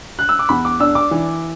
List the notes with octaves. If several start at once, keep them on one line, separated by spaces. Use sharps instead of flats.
F#6
E6
D6
E2 B5
D6
D4 E6
D6
E3